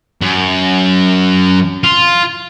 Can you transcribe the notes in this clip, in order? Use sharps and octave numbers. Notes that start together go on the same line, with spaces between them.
F#2
F4